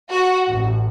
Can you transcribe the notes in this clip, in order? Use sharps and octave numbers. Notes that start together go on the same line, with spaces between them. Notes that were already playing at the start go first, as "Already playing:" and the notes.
F#4
A1